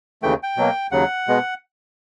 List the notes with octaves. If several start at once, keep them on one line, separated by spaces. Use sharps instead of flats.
D#2 C#3 E3 A3 G5
G5
B2 F#3 A#3
D#2 C#3 F#3 F#5
B2 G#3 B3